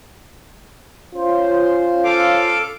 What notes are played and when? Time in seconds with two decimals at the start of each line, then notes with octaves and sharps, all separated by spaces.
1.15 C#4 F4 C5
2.05 A4 F5 D6